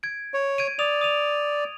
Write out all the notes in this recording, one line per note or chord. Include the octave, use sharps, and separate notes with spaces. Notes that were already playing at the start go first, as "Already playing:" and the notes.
G#6 D7
C#5
G#6 D7 D#7
D5 D#6 F7
D#6 D#7 F7